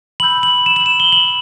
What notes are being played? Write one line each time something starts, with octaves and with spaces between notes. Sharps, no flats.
B5 E6 G6 F#7
F#7
E7
F#7
E7
G7
F#7